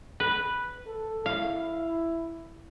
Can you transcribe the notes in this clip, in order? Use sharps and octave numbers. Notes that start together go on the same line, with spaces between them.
B4
A4
E4 F5